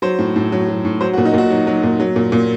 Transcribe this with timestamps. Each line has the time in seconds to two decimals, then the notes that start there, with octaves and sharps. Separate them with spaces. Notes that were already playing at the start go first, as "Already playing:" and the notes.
0.02 F#3 C5
0.19 A2
0.36 A2
0.52 F#3
0.69 F#3
0.85 A2
1.01 F#3 C5
1.13 F#4
1.18 A#2
1.25 D#4
1.34 A#2 F#4
1.51 F#3
1.67 F#3
1.83 A#2
2.00 F#3
2.16 A#2
2.32 A#2